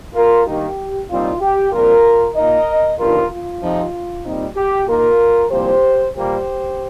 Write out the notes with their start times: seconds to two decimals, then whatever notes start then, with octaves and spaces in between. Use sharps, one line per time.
0.14 F4 A#4
0.46 G2 D#3 A#3 D#4 G4
1.09 C2 A#2 G3 C4 D#4 F4
1.41 G4
1.72 A#1 A#2 G3 C4 F4 A#4
2.36 A#2 A#3 D#4 A#4 D#5
2.99 G1 G2 F3 D#4 F4 A#4
3.31 F4
3.61 F2 C3 F3 D#4
4.25 A#2 G3 C4 D#4
4.56 G4
4.88 A#2 A#3 D#4 F4 A#4
5.51 C2 A#2 F3 A#3 G4 C5
6.14 A#2 G3 A#3 G4 C5